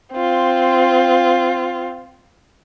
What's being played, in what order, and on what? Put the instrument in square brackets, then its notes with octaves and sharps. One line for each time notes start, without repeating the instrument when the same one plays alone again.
[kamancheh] C4 F4